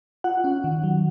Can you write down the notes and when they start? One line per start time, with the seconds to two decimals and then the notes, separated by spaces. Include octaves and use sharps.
0.24 F4 F#5
0.44 C#4
0.64 D#3
0.84 F#3